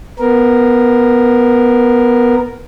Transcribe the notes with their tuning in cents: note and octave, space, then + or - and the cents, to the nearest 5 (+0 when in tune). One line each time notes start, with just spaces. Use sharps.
B3 +0 A#4 +0